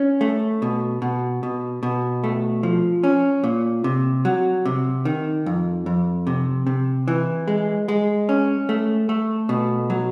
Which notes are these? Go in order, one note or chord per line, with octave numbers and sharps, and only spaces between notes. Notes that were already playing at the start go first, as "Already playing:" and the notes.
Already playing: C#4
A3
B2
B2
B2
B2
A3
F3
C#4
A#2
C3
F#3
C3
D#3
F2
F2
C3
C3
E3
G#3
G#3
C#4
A3
A3
B2
F#3